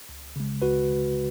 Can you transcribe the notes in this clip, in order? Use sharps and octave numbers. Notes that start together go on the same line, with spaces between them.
C#2
C#3 G#3
C#2 F#4 B4
C#3 G#3